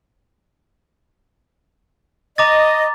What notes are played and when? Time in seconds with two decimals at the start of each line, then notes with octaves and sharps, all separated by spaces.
2.38 D#5 A#5 D6 A6